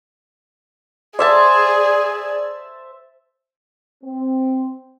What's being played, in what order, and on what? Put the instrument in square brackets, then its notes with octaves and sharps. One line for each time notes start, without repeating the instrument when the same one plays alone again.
[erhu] G#4 [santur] C5 E5 A5 [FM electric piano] D5
[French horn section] C4